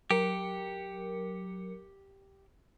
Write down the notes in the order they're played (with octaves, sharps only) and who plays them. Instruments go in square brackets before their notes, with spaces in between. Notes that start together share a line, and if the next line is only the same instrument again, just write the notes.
[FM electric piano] F#3 A#4 C#7 [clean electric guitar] G4